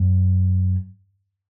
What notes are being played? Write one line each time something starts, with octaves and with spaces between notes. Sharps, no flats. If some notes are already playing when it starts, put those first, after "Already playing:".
Already playing: F#2